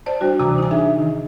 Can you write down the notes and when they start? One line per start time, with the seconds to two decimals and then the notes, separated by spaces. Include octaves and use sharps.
0.06 C5 D5 A5
0.21 G3 D4 F#4
0.39 D2 C3 E3 A#5 D6 E6
0.58 D#4 G#5
0.71 D4 G#4 E5
0.99 D#3